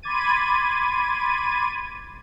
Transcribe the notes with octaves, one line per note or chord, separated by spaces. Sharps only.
B5 C6 D6 G#6 A6 D#7